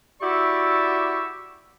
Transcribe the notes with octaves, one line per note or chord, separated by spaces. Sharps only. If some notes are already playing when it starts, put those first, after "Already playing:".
E4 F#4 G4 D5 C#6 E6